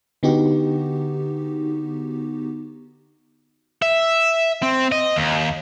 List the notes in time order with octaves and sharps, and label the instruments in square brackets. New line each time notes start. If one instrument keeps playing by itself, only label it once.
[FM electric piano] D3 B3 D#4 F#4 G4
[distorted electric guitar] E5
C4
D#5
D#2